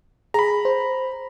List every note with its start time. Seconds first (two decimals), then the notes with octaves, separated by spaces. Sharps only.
0.34 G#4 A#5 B5
0.65 C5